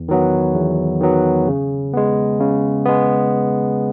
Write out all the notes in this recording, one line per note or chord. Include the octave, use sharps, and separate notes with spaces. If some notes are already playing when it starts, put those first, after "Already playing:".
Already playing: E2
D#3 F#3 B3
E2
D#3 F#3 B3
C#3
G#3 B3
C#3
G#3 B3